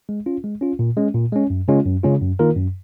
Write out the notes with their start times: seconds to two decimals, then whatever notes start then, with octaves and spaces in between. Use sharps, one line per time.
0.09 G#3
0.26 C#4 F4
0.44 G#3
0.61 C#4 F4
0.79 A#2
0.97 G#3 C#4
1.15 A#2
1.32 G#3 C#4
1.50 F#2
1.68 C#3 G#3 C#4 F4
1.86 F#2
2.03 C#3 G#3 C#4 F4
2.21 F#2
2.39 D#3 A#3 F4 A#4
2.56 F#2